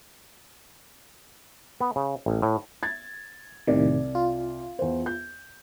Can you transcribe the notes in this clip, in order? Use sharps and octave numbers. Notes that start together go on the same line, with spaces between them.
B3
C#3
A1
A2
G#6 A6
C2 A2 C3 D#3 D5
F4
E2 C5
G6